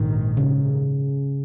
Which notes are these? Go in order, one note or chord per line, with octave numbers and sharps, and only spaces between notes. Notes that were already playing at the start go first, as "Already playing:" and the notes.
Already playing: A#1 G#2 D#3
C#3